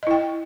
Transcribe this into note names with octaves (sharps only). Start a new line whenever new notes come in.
E4 D#5 G5